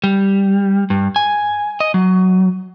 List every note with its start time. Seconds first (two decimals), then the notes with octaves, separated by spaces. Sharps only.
0.04 G3
0.90 G2
1.16 G#5
1.80 D#5
1.94 F#3